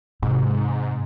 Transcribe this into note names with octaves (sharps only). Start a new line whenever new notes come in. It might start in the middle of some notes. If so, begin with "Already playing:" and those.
G#2 C3